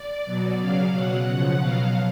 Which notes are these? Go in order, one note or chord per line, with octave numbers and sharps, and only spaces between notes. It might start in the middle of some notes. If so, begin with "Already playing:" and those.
Already playing: D5
B2 F#3
C#3 F#3 F5
B2 F#3 F#5
C#3 F3
B2 F#3 F5